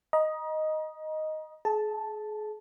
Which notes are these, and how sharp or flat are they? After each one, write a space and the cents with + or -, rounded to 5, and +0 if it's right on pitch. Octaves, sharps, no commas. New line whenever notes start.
D#5 +0 A#5 +35
G#4 +35 A5 +0